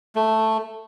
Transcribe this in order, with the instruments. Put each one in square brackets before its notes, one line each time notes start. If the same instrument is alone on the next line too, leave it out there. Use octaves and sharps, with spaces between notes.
[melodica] A3